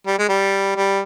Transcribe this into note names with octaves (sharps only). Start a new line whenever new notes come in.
G3
G#3
G3
G3